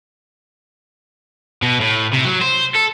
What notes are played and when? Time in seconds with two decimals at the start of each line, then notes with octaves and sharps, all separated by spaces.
1.62 B2
1.81 A2
2.13 C3
2.25 F#3
2.42 C5
2.75 A4